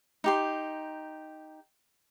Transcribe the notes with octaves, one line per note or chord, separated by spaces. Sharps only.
D#4 G4 C6